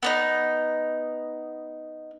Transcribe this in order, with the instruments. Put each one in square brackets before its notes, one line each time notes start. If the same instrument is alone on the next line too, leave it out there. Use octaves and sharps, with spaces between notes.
[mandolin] B3 D4 D#4